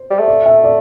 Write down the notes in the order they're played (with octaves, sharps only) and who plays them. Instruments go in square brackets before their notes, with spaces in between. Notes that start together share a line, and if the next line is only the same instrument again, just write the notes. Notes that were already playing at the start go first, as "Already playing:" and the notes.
Already playing: [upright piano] C5
[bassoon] G3
A3
[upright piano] D5
E5
D5